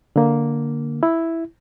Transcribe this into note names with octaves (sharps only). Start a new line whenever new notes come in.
D3 A#3
E4